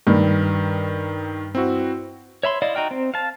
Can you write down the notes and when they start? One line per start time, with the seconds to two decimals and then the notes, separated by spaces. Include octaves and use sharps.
0.07 G2 D#3
1.55 C4 E4 F#4
2.43 C#5 E5 B5 C6
2.62 E4 D5 D#5 F5
2.75 D#4 F#4 G5 F6
2.91 C4
3.14 F5 A5